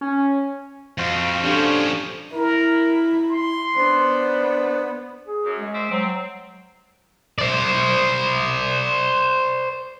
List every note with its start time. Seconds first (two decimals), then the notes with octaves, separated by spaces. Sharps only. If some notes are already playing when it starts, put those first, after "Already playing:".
0.01 C#4
0.98 F2 F#4 C5 F5
1.44 F3 C#4 D4 G4 A4
2.33 E4 A#4
3.30 C6
3.77 B3 D4 C5 D5
5.26 G#4
5.44 F#2
5.58 G#3
5.74 C5 D5 E5
5.91 F#3 C4
7.38 C5 D5